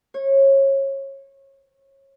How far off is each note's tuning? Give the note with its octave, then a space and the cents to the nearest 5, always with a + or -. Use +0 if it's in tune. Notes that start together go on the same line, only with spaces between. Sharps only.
C#5 -25